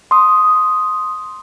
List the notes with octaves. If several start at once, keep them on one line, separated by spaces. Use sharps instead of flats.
C6 D#6